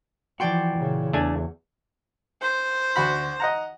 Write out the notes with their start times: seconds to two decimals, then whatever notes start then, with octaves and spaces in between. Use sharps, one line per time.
0.40 E3 F3 F#4 D5 G5 C6
0.75 A#2 C#3
1.13 E2 A3 D4 G#5
2.42 C5
2.96 D2 F#4 B5
3.40 D#5 F#5 A#5